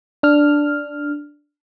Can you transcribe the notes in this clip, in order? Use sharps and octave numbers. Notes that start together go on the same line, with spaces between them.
D4 F6